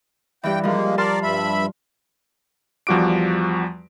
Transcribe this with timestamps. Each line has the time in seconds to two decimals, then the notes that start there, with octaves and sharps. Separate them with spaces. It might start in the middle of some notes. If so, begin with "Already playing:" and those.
0.44 G2 E3 G5
0.64 F3 G3 G#3 A#3
0.98 A#4 D5 A5 C6 F6
1.23 G2 E5 B5
2.87 E2 F3 G3 F#4 D6 D7